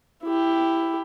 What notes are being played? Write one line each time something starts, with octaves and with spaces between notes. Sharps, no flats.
E4 G4